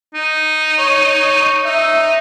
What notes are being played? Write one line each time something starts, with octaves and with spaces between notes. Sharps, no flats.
D#4
C#5
D#4 E5